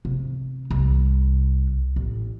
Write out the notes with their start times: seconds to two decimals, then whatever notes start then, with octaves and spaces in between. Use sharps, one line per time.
0.05 C3
0.70 C2
1.96 A1